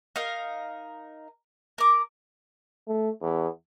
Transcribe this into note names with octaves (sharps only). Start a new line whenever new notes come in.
D#4 A#4 F5
A#4 D6
A3
E2